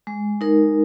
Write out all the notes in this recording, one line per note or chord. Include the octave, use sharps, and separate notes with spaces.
G#3
D#4 A#4